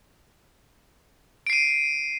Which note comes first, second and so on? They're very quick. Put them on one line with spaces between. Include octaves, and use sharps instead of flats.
D7 C7 D#7